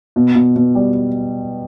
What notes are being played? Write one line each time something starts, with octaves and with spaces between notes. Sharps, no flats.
B2
B2
B2
G3